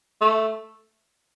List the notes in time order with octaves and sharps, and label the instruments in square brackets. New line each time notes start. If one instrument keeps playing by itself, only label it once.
[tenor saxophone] A3